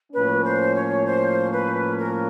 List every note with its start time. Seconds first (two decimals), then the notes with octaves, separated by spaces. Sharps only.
0.13 A2 F3 A#3 C#4 B4
0.44 C5
0.75 C#5
1.06 C5
1.52 B4
1.98 A#4